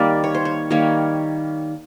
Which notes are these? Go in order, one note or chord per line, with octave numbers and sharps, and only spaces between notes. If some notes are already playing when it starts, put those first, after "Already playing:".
Already playing: D#3 G3 A#3 D5
C#5
C5
C#5
D#3 G3 A#3 C#5